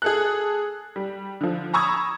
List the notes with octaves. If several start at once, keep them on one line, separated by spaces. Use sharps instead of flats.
G#4 A4 F#6
G3
D3 F3
A#5 B5 C#6 D#6 E6 G#6